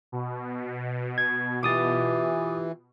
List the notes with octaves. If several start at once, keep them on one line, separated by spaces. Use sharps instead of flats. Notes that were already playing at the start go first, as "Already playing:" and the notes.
B2
G#6
E3 F4 G4 D6 D#6 A6